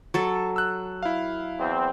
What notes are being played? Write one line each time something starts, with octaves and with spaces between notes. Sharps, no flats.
F#3 A4 C#6
E6 F#6
E4 F5
E2 C4